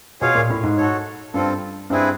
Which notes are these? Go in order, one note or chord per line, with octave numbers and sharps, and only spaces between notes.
B2 F4 G#4 C#5 F5
A#2
A2
G#2
F#4 A4 C#5
G2 C4 F4 A4
G2 C4 E4 G#4 B4